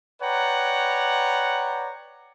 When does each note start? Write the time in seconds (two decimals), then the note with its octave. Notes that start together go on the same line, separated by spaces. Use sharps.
0.22 B4 C#5 D5 F#5 G5 A#5